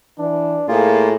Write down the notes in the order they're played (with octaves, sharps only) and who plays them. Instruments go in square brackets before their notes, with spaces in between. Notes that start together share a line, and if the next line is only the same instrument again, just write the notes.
[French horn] E3 [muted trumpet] D4
[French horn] A2 [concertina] A#3 F4 [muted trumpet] G#4